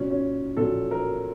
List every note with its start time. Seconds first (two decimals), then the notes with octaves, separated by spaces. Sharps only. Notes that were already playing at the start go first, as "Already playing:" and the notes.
Already playing: A#2 F#3 C#4
0.11 C#4
0.57 A#2 F#3 A4
0.91 A#4